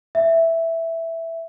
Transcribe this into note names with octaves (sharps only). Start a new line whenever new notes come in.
E5